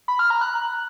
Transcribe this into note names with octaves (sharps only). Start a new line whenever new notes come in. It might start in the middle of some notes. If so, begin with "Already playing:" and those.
B5
F6
A#5
F#6
F#6